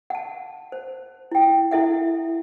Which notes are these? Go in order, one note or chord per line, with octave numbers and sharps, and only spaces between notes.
F#5 A5
C5
E4 G5
E4 A4 E5 F#5